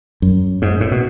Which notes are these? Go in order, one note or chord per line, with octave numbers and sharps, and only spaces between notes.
F#2
G#2
A2
B2